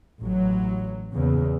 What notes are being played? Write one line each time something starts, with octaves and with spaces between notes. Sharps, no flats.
A1 F#3
E2 A#2 C#3